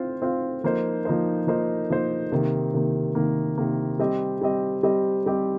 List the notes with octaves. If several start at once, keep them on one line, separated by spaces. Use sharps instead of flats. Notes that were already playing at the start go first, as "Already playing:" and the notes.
Already playing: C4 F4 C5 F5
C4 F4 C5 F5
F3 A#3 D#4 C5
F3 A#3 D#4 C5
F3 A#3 D#4 C5
F3 A#3 D#4 C5
C3 D#3 A#3
C3 D#3 A#3
C3 D#3 A#3
C3 D#3 A#3
G3 C4 G4 D#5
G3 C4 G4 D#5
G3 C4 G4 D#5
G3 C4 G4 D#5